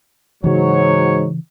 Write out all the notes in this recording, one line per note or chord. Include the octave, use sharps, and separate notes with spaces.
G#2 C#3 E3 F#3 C#5